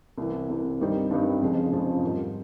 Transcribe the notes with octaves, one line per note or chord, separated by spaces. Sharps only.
C2 C3 E3
C2 C3 E3
G2 D#3 G3 C4 D#4
G2 D#3 G3 C4 D#4
F1 F2 C#3 F3 G#3
F1 F2 C#3 F3 G#3
G#2 D#3 G3